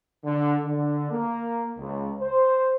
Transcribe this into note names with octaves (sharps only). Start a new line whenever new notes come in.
D3
D3
A#3
C#2
C5